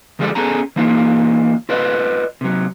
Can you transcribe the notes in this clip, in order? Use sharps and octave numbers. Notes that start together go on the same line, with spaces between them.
D2 F3 G3 G#3 A4 D5
B3 C#4 G#4 A4 G#5 A#5
E3 A#3 D#4 F4
F4 B4 D5 D#5
C3 F#3